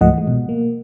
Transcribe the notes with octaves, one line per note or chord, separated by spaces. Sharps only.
C#2 G#2 F3 A3 D#5 F#5
E3 G#3
B2
A#3